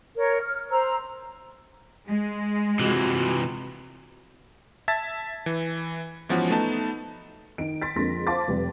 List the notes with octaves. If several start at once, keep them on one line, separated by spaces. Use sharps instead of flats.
A#4 C#5
F6
C5 A#5 E6
G#3
C3 E3 F4 F#4
E5 A5 G#6 A6 B6
E3
G#2 E3 F3 B3 C#4 F#4
A3 B3 D#4 A5
D#3 D#4 D7
C6 A6 B6
F2 D3 G#3 A#3 C6 A#6
C5 F5 A5 C6 D6 A6
F1 G3 B4